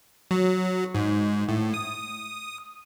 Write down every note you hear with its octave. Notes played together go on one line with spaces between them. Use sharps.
F#3
G#2
A2
D#6